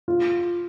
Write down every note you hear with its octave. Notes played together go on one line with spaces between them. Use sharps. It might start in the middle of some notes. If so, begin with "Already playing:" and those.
F4